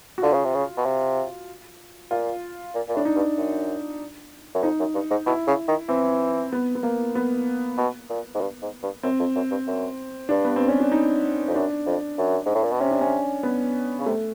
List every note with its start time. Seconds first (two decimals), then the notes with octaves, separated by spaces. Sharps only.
0.18 F#4
0.22 D3 F4
0.33 C#3
0.45 C3
0.54 C#3
0.77 B2
0.85 C3
2.11 A#2 F4
2.75 A#2
2.88 A#2
2.95 A2 D4
3.05 D#4
3.16 G2
3.37 F#2
4.55 F#2
4.63 F2 D#4
4.79 F#2
4.94 G2
5.10 G#2
5.26 B2 E4
5.47 C#3
5.68 D#3
5.88 E3 C4
6.52 B3
6.75 B3
6.83 A#3
7.15 B3
7.78 B2
8.10 A#2
8.34 G#2
8.41 G2
8.62 G#2
8.83 G2
9.03 F#2 C4
9.19 F2
9.35 F#2
9.51 G2
9.67 F#2
10.29 G2 D4
10.45 B3
10.56 C4
10.68 C#4
10.80 D4
10.92 D#4
11.48 F2
11.55 F#2 D4
11.86 F2
12.18 F#2
12.46 G#2
12.55 A2
12.63 A#2
12.72 B2
12.81 C3 C#4
12.91 D4
13.01 C#4
13.43 B3
13.99 C#3
14.06 C3 A3